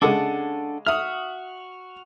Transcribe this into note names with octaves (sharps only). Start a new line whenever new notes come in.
C#3 G#3 D4 A4 F#5 D6
F#4 E5 D#6 F6